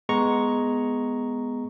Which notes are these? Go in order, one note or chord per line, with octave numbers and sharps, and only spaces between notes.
G#3 B3 A#5 C#6